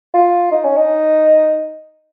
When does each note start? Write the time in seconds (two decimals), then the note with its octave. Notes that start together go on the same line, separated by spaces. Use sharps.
0.14 F4
0.51 D#4
0.64 C#4
0.77 D#4